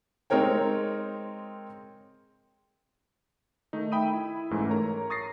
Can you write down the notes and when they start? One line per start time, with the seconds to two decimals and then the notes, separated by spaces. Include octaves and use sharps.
0.30 G#3 C4 D#4 A#4 C#5 G5
3.73 D#3 A3 D#4
3.92 E5 G5 B5 D#6 D#7
4.13 E4
4.51 G#2 E3 A3 C#4
4.69 A#4 C#5 A#5
5.10 C#6 D#6 A6 A#6 C7